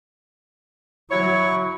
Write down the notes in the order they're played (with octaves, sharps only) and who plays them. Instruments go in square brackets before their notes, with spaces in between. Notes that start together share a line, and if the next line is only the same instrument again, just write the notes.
[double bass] F#3 [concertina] E4 C#6 [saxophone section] F#4 C#5